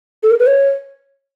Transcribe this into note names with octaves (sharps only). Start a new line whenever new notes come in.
A4
A#4
B4
C#5